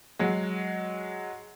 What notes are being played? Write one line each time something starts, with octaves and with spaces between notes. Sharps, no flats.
F#3 G#3